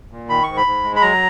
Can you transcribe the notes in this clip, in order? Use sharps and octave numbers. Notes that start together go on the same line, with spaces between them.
A#2
D#3 B5
G#2 C#6
B5
G#2
G#3
B5
F#3 A#5